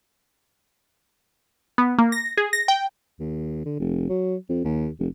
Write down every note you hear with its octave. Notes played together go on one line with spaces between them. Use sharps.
B3
A#3
A#6
G#4
A#6
G5
D#2
D3
F1
F#3
F2
D#2
F1